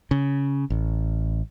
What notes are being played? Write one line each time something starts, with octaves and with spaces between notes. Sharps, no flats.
C#3
A1